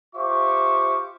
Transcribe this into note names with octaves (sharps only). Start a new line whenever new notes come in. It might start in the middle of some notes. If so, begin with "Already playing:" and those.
F4 G4 C5 E5 C#6 D6